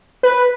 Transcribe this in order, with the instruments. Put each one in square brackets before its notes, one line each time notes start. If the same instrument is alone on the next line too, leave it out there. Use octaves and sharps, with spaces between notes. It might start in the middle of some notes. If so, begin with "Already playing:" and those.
[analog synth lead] B4